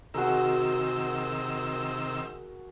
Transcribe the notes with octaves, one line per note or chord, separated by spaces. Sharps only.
C3 D#3 F#4 G#4 A#4 E6